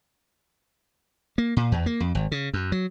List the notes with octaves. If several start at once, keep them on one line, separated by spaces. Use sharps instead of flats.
A#3
A#2
E2
A#3
F2
G#1
C#3
F#2
F#3